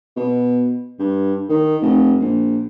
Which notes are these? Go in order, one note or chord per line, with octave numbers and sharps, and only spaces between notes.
B2
G2
D#3
F1
A#1